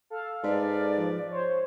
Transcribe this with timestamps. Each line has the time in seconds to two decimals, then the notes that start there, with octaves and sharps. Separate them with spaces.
0.10 A4 F5
0.43 G#2 B4 D5
0.97 F3
1.31 C5 C#5